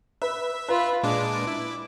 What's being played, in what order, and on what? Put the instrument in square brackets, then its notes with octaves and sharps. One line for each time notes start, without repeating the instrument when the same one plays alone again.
[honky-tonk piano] B4 [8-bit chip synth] E5
[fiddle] F4 B5 [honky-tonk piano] B4
[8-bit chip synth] A#2 G#3 D4 [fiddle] D6
[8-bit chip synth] E4